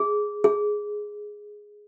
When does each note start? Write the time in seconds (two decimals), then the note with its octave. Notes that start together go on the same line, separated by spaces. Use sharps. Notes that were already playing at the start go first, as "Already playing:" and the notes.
Already playing: G#4
0.44 G#4